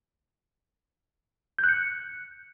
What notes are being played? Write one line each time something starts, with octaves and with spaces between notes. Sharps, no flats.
G6
F#6
C#7